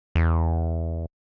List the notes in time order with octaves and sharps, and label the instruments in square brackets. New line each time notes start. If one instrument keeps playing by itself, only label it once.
[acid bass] E2